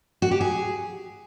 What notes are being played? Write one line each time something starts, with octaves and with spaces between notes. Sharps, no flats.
F#4
G4
G#4